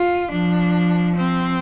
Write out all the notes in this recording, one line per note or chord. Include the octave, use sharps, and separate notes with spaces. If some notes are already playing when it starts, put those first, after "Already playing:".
Already playing: F4
F3 D4
C4